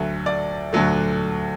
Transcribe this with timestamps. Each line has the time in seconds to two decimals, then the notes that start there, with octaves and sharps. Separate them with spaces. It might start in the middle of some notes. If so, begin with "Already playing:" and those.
Already playing: D2 D3 F#3 A3 E5
0.26 D5
0.73 D2 D3 F#3 A3